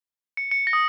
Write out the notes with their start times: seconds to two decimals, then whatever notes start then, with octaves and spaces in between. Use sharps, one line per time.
0.37 C#7
0.51 C#7
0.67 A#6
0.73 D#6